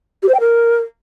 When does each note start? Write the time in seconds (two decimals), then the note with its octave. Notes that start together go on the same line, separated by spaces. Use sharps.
0.23 G4
0.29 C5
0.34 G5
0.40 A#4